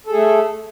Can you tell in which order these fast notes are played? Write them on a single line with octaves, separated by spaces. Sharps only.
A4 G#4 A3